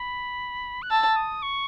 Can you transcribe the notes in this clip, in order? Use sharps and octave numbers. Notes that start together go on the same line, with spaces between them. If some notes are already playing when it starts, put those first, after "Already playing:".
Already playing: B5
F#6
A5 E6
D#6
C#6